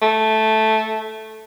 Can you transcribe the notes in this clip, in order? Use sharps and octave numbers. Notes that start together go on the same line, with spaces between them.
A3